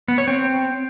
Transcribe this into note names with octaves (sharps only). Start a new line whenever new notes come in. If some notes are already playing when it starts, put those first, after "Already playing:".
B3
C#5
C4